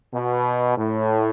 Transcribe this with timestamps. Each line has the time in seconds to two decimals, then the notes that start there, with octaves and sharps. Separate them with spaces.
0.13 B2
0.77 A2